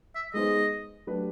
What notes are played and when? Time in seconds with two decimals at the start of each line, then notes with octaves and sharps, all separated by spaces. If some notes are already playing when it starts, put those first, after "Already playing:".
0.15 E5
0.33 G#3 B3 D#4 G#4 C5 D#5
1.07 F#3 A3 D4 G4 B4